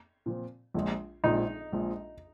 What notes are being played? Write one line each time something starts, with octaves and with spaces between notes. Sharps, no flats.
A#2 F3 C4
A#1 A#2 F3 G#3
A#1 A#2 F3 G#3 D#4
A#1 A#2 F3 G#3